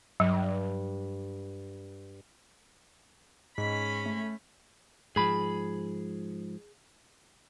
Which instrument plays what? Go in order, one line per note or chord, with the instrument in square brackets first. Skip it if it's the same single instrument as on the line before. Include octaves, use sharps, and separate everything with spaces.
[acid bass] G2 [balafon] F#3
[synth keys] G#2 [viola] C#4 B5 [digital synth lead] B6
[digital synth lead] A3
[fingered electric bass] G#2 F3 [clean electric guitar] G#4 B5